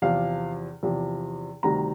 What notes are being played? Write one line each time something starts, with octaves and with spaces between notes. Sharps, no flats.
E2 C3 F3 F5
E2 C3 F3
D2 C3 D#3 G3 A#5